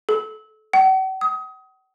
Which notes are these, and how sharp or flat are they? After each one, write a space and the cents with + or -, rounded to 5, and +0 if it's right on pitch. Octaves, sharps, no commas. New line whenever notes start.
A4 -25
F#5 +45
D#6 +25